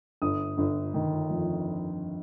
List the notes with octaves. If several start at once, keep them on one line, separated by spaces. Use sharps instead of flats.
G1 D#6
G1
D#3
F2